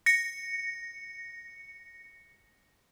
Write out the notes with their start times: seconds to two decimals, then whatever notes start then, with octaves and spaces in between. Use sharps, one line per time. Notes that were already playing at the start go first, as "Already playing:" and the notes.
0.06 A#6 C#7